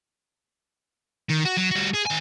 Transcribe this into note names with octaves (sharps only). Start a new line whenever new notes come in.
D#3
F#4
F#3
G3 F#4
G#4
D#3 G#5